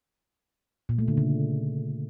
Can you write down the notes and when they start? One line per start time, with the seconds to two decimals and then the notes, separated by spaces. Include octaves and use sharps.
0.89 A#2
0.98 A3
1.08 D3
1.17 C#3